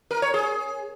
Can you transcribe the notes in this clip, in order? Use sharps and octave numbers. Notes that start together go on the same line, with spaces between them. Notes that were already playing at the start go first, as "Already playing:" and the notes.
A#4
C#5
G#4